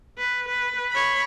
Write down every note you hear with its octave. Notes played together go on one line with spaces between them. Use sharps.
B4
B4
C#5 B5